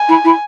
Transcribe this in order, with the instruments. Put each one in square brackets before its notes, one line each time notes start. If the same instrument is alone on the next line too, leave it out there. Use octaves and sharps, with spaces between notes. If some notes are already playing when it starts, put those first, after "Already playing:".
Already playing: [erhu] G#5
[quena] E4
E4